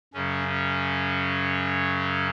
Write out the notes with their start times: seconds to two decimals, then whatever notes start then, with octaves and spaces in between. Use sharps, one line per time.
0.14 F#2 C#3 F#3 C#4
0.48 C#4